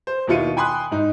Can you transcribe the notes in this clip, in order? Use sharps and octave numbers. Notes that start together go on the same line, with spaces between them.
C5
D#2 B2 E4 F4 C#7 D#7
G5 G#5 B5 C6 D#6 F#6
G#2 D#4